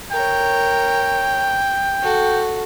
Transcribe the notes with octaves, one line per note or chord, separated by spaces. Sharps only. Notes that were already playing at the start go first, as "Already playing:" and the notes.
A#4 C#5 G5
F#4 A4